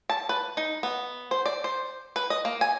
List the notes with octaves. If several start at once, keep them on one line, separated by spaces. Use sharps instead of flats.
A5
B4
D#4
B3
C5
D5
C5
B4
D#5
A#3
G#5